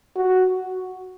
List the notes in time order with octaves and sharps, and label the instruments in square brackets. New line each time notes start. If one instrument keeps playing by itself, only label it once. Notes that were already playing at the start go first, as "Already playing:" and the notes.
[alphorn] F#4